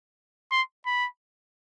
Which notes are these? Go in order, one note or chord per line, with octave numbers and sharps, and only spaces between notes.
C6
B5